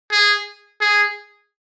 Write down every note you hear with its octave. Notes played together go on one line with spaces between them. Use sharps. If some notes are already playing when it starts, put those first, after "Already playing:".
G#4
G#4